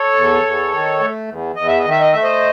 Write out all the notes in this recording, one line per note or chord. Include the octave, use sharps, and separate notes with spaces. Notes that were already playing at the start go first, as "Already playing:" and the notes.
Already playing: A4 C#5
E2
E2
D#3
A3
E2
E2 D#5
E5
D#5
D#3
E5
D#5
A3 E5
C5 D#5